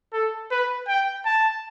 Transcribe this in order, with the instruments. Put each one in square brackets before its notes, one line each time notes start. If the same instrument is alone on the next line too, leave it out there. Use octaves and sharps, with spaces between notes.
[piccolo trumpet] A4
B4
G5
A5